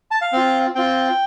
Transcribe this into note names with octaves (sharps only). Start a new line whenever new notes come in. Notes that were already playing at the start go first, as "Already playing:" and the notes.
A5
F5
C4 F4
C4 F4 G5